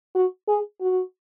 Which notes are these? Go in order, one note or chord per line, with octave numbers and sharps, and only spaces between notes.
F#4
G#4
F#4